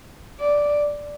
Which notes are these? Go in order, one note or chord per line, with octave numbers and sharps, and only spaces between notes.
D5